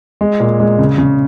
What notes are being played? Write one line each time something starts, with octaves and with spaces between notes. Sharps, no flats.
G#3
A#2
G#3
C#3
C#3